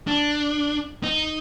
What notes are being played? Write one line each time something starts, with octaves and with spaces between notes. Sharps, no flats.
D4
D#4